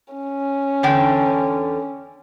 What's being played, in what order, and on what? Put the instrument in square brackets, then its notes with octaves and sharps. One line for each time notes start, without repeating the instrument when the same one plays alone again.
[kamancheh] C#4
[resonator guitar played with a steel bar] E2 D3 G5